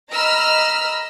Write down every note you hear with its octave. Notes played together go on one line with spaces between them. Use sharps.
D#5 A#5 B5 E6 F6